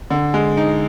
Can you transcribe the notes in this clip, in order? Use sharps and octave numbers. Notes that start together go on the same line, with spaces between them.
D3
G#3
D#4